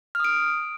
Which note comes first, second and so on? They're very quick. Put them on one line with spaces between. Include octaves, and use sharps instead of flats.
F6 D#6 D7